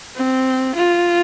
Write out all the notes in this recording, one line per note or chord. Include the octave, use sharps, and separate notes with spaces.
C4
F4